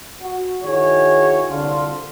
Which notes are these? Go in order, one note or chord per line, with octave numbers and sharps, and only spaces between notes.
F#4
D#3 E4 F#4 G#4 C#5
C2 D3 F4